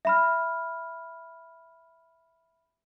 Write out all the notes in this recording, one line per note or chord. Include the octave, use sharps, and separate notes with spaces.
E5 B5 F6